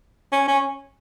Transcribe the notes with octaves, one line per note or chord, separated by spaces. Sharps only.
C#4
C#4